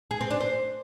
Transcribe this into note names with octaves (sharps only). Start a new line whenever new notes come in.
G#4
C4
D4
C5